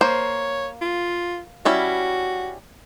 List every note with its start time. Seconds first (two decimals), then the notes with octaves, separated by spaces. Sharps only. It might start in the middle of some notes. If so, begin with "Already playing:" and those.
0.01 A#3 C5 C#5
0.81 F4
1.65 G3 C#4 E4 F#4